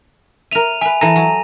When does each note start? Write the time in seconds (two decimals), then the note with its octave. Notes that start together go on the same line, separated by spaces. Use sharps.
0.51 A#4 E5 D#7 F7
0.81 B4 E5 G#5
1.01 E3 A4 A#5 A#6 D#7
1.16 F#3